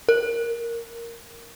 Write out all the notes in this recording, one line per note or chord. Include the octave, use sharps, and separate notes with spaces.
A#4